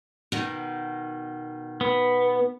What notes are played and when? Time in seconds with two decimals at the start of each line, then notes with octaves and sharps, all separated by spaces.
0.32 B2 D#3
1.81 B3